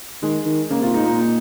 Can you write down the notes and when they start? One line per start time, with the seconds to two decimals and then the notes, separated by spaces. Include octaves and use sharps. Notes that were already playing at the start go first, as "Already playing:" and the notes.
0.23 D#3 G#3
0.46 D#3
0.70 C#3 A#3
0.82 C3 F4
0.94 G#2 D#4
1.05 A#2 D#4
1.18 D#4